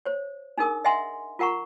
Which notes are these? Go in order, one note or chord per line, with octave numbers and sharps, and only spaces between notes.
C5 C#5
D4 D#4 G#4 A#4 D#6
D#5 E5 F#5 G#5 C6
F4 A#4 F#5 A#5 C#6